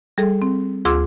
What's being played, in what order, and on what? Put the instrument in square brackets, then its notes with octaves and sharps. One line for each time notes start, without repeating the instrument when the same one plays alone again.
[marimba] G3 G#4 A4
C4
D2 F4 G#4 C6 D6 E6